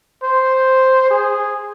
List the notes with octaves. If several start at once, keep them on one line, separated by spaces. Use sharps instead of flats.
C5
G#4